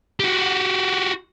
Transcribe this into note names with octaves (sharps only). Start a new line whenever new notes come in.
F#4 G4